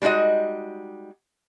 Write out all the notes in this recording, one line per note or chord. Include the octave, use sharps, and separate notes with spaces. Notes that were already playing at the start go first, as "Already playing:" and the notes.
G3 G#3 D#4 F#4 D#5